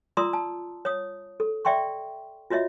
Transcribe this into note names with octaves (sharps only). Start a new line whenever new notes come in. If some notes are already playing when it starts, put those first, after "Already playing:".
F4 D5 A#5 C6 D#6 E6
A5
C#5 D#6
A4
D5 E5 G5 C6 C#6
F4 F#4 C#5 D#5 E5